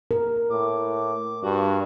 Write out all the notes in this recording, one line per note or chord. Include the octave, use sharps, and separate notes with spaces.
A#4
A2 D6
G2 F#4